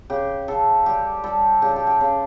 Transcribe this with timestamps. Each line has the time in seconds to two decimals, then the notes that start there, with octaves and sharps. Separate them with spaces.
0.10 C#3 G4
0.48 C#3 A4
0.86 G3 G4
1.23 G3 A4
1.62 C#3 G4
1.69 A4
1.76 G4
1.87 G4
2.01 C#3